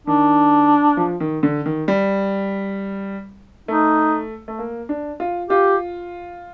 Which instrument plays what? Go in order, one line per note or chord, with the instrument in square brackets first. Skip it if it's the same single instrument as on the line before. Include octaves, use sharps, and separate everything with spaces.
[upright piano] D#3 [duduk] D4
[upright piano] F3
D#3
D3
D#3
G3
[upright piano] A3 [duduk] D#4
[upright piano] A3
A#3
D4
F4
[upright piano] F4 [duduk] G4